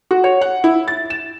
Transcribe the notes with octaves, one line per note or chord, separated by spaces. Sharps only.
F#4
C#5
F#5
E4
A6
E7